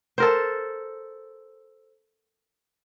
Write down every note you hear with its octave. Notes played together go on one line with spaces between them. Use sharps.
A4 A#4 C5